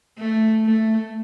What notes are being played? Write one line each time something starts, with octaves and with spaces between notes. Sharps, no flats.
A3
A3